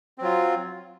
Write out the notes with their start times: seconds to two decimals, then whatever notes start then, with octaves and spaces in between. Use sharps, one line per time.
0.18 C4
0.21 F#3
0.24 F4